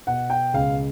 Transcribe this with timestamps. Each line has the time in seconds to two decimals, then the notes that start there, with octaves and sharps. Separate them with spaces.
0.07 B2 F#5
0.30 G5
0.54 C#2 F5